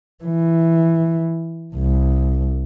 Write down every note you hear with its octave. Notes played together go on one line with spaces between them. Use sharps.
E3
C2